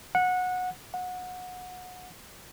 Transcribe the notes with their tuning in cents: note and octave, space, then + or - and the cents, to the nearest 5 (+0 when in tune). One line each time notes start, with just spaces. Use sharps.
F#5 -20
F#5 -25